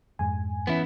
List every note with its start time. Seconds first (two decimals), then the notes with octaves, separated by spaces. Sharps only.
0.19 F2 G#2 G#3 G#5
0.67 E3 B3 C#4 E4